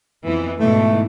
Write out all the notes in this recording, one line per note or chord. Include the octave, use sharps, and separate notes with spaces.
F2 E3 B3
G#2 B2 E3 A3